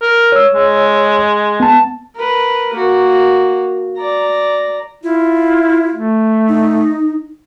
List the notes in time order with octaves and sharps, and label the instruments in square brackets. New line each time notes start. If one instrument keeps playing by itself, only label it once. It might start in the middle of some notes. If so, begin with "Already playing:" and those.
[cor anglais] A#4
[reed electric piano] C#5 E6
[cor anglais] G#3
[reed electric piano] B3 A5
[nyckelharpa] A#4 B4
A#3 F#4
D5 A#5
[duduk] E4 [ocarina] F4
[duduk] A3
[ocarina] D#4